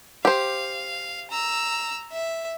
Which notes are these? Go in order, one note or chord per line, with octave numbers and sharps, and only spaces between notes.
G4 C5 F5
A#5 E6
E5